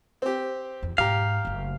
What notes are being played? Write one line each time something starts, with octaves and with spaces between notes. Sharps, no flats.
C4 G4
E2
G#2 B2 G4 F5 A#5
F#1 A3